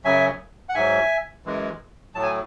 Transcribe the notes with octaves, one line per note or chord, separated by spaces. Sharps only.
F#2 C#3 F#3 E5 G#5
F#5
G#2 F#3 E5 G#5
F#2 E3 G#3
A2 F#3 A5
G#5